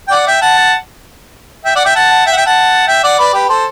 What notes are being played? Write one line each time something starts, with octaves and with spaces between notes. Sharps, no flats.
G5
D5 F#5
E5 G5
F#5 A5
E5 G5
D5 F#5
E5 G5
F#5 A5
E5 G5
F#5
E5 G5
F#5 A5
E5 G5
D5 F#5
B4 D5
G4 B4
A4 C5